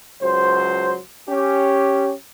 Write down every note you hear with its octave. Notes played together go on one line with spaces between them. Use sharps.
C#2 F#3 C5
C#4 G4